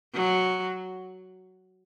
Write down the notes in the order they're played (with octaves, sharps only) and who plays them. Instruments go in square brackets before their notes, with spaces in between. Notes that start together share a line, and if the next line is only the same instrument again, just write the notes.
[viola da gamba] F#3